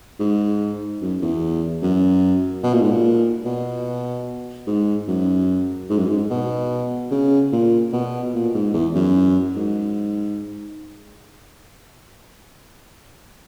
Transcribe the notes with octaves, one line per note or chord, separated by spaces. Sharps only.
G#2
F#2
E2
F#2
B2
A#2
G#2
A#2
B2
G#2
F#2
G#2
F#2
G#2
B2
C#3
A#2
B2
A#2
G#2
E2
F#2
G#2